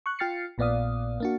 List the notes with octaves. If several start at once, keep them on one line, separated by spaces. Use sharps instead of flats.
C#6 F#6
F4 G5 F6 A6 C7 C#7
A#1 A#2 B3 D5 F5 D#6
A#3 D4 F#4